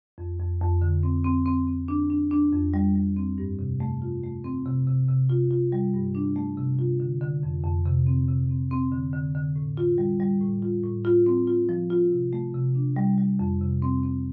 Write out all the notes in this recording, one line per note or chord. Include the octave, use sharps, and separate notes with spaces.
F2
F2
F2
D3
C4
C4
C4
C4
D4
D4
D4
F2
G3
G3
C4
G2
C3
A3
F4
A3
C4
C3
C3
C3
F4
F4
G3
G2
D4
A3
C3
F4
D3
D3
F2
F2
C3
C4
C3
C4
C4
D3
D3
D3
A2
F4
G3
G3
A2
F4
A2
F4
C4
F4
F3
F4
C3
A3
C3
D4
G3
G3
F2
C3
C4
C4